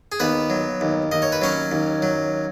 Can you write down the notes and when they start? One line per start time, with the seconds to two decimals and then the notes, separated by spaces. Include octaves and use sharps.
0.12 G#4
0.20 D#2 B3 B4
0.50 F#3
0.81 D#2
1.12 D#2 D#5
1.22 C#5
1.32 B4
1.42 F#3 C#4 C#5
1.71 D#2
2.02 F#3